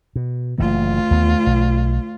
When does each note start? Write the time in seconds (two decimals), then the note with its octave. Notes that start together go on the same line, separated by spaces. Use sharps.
0.16 B2
0.58 F#1 D2 E3 A#3 F4
1.11 D#2 A3 B3
1.46 B1